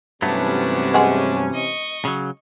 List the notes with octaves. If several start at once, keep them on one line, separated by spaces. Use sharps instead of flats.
G2 C3 E3 F#3 A3 B3 C#4 D4
G#3 G#4 F#5
D#5 C#6
C#3 F#3